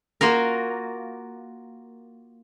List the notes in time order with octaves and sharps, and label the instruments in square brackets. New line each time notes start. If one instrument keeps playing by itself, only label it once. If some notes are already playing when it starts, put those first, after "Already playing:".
[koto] A#3 F4 F#4 A#4